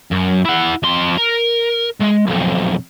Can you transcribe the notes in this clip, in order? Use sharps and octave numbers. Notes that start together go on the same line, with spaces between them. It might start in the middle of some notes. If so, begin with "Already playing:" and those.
F#2
E4 F#5
F2 C6
A#4
G#3
B1 F2